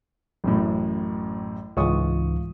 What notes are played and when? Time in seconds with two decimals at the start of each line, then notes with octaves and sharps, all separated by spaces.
0.44 A1 F#2 A2
1.77 C#2 G#2 E3 F4 C#6 D#6